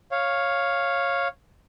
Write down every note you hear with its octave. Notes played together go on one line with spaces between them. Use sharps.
C#5 F5